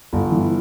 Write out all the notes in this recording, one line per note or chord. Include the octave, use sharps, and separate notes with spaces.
G1
E3